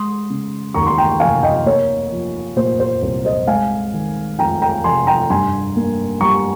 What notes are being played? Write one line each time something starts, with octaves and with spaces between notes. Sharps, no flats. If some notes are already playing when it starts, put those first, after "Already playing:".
Already playing: G#3 C6 D#6
C#3
D#2 A#5 C#6
C6
G5 A#5
F1 F5 G#5
D#5 G5
A#3 C#5
F3
A#2 C5
C5
C2 C5
C5 D#5
G#3 F5 G#5
D#3
F2 G5 A#5
G5 A#5
F1 G#5 C6
G5 A#5
G2 G#5 C6
A#3
G3 A#5 C#6